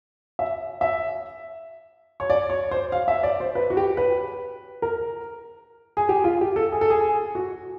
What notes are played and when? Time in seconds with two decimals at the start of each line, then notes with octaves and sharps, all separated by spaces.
0.39 E5
0.81 E5
2.20 C#5
2.30 D5
2.50 C#5
2.71 C5
2.92 F5
3.08 E5
3.23 D5
3.40 C5
3.55 B4
3.70 F#4
3.77 G4
3.97 B4
4.82 A#4
5.97 G#4
6.09 G4
6.24 F4
6.41 G4
6.56 A4
6.72 G#4
6.81 A4
6.90 G#4
7.35 F#4